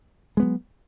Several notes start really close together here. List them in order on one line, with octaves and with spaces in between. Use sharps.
G#3 B3 F#3